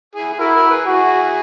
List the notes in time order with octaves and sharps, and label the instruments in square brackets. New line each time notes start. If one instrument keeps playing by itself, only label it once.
[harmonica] E4 G#4
G#4
[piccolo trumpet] E4 [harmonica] F#4 A#4
[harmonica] F#4 A#4
G#4 B4
[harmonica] E4 G#4 [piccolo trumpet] F#4